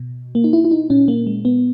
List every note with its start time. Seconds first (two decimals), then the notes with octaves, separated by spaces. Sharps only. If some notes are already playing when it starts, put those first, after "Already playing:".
Already playing: B2
0.35 A#3
0.44 D#4
0.53 E4
0.64 E4
0.71 D#4
0.90 A#2 C#4
1.08 A#3
1.27 G#3
1.45 B3